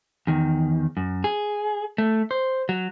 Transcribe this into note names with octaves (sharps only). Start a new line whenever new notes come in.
E2 D#3
F#2
G#4
A3
C5
F#3